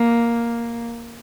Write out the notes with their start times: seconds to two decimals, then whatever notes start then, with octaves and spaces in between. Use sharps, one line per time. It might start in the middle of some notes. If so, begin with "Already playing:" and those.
Already playing: A#3